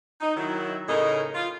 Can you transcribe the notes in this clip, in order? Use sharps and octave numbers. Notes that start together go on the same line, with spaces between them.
D#4
D#3 F#3 E4
A2 C#3 C#4 D#4 A#4 D#5
F4